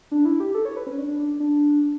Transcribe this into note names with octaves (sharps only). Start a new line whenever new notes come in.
D4
E4
G4
A4
C#5
B4
C#4
D4
D4
D4
D4